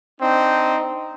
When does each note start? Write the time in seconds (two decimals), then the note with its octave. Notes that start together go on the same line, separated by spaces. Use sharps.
0.20 C4 D4 D#4